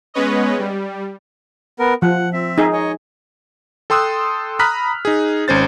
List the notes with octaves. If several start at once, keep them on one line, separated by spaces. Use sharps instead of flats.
G#3 B3 C#4 B4 C#5 D#5
G3
B3 A#4
F3 F#5
C4 E5
D#4 G#4
C#5 D#5
A4 G5 C6 D#6 E6 F#6
A#5 B5 D#6 F6 F#6 B6
D#4 G#4
G#1 C#4 C5 A6